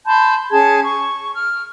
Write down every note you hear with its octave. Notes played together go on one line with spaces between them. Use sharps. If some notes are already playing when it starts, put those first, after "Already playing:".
A5 B5 C6 G6
C#4 G#4 A5 G#6
C#6
F6